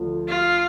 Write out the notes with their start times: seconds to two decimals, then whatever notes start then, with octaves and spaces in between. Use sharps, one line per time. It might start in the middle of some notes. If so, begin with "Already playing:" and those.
Already playing: D2 D3 F3
0.28 F4